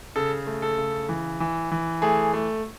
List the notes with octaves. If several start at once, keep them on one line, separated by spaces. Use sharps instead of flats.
C#3 A4
A3
A4
C#3
E3
E3
E3
A3 G#4
A3